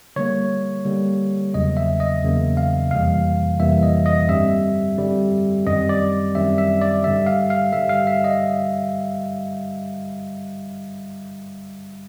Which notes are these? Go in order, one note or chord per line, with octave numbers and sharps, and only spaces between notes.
D3 G3 A#3 C#5
D3 G3 A#3
E2 C#3 F#3 A#3 D#5
E5
D#5
E2 C#3 F#3 A#3
F5
F2 C3 E3 G3 A#3 F5
F2 C3 E3 G3 A#3 E5
D#5
D#5
G2 D3 G3 C4 E5
G2 D3 G3 C4
F#2 D#3 G3 C4 D#5
D5
F#2 D#3 G3 C4 E5
E5
D5
G2 D3 G3 E5
F5
F5
G2 D3 G3 E5
F5
E5
D#5